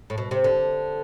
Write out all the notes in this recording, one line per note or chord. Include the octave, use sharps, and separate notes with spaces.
A2
B2
C3
D3